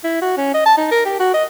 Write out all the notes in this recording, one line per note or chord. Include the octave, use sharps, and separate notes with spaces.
E4
F#4
C#4
D#5
A5
D#4
A#4
G4
F#4
D#5